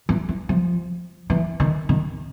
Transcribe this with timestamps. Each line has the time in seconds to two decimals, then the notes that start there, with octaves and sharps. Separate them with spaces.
0.09 E3
0.29 E3
0.49 F3
1.30 E3
1.60 D#3
1.89 D#3